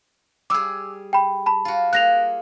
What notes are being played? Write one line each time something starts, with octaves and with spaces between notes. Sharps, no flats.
G3 G#4 D6 E6
G5 B5
A5 B5
F4 F#4
A#3 G#4 F#6 A#6 F7